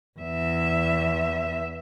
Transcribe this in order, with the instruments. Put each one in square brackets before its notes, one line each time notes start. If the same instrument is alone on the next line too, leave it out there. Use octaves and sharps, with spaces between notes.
[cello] E2 E5